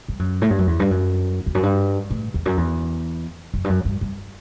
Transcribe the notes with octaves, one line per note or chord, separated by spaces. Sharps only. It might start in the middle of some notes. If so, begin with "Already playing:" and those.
G2
F#2
A2
G2
F#2
E2
G2
F#2
E2
F#2
G2
A2
E2
F#2
E2
F#2
G2
F#2
G2
G2